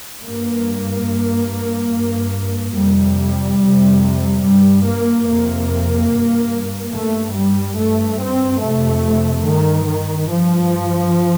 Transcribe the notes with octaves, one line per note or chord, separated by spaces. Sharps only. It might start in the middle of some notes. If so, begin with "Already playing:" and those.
G2 A#3
G2
G2
F2 C3 G3
F2 C3
G2 G3
A#3
F2 C3 A#3
G2
G2 A3
G3
G2 A3
C4
F2 C3 A3
G2 D#3
D#3
G2 F3